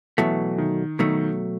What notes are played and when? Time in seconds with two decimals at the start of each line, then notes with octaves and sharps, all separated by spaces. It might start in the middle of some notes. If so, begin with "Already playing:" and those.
0.18 B2 E3 F#3 A3
0.58 D#3
0.99 B2 D#3 F#3 A3